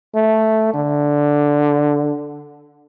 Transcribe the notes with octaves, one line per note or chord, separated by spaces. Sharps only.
A3
D3